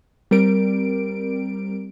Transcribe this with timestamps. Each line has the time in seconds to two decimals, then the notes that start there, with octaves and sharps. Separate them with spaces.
0.31 G3 C4 A#4 D7